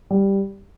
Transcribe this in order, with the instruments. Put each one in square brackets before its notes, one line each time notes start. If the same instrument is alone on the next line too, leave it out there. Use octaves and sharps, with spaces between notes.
[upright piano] G3